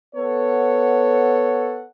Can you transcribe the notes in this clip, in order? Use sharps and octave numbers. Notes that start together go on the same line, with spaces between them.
B3 A4 C#5 F#5